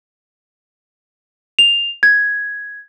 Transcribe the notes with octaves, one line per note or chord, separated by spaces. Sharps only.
F7
G#6